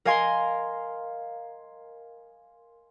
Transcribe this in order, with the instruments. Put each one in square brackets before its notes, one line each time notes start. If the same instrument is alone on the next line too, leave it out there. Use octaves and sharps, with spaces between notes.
[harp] A#4 D#5 F5 G#5 A#5 C6